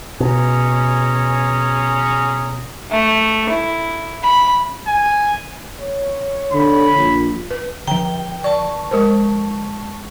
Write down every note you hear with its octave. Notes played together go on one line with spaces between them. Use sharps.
B2 C#4 G#4 A#5
A3
E4
B5
G#5
C#5
D3 B5
A#1
B4
D3 F3 G5 A#5
D5 A5 C#6
G#3 A#4 C5